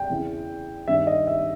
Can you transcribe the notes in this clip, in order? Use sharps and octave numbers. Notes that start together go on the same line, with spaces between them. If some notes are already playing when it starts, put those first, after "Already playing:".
Already playing: G5
E2 C#3 E3
G2 D#3 E5
D#5
E5